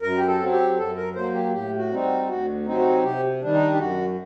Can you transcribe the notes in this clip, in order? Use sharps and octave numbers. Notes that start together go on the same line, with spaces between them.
F#2 A#4
G4
A4
F#3 C4
G4
F#2 A4
A#4
F#3 A#3 C5
G4
A2 G4
F#4
G3 C4 D#4
F#4
D2 F#4
C3 F#3 C4 D#4
F#4
C3 G4
D#3 G3 D4
D#4
G4
F#2 F#4